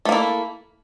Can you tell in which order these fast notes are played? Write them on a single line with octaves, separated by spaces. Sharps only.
A3 A#3 E4